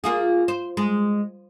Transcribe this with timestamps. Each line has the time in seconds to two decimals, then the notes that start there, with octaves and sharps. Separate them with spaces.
0.04 A#3 F4 G#4
0.48 C5
0.77 G#3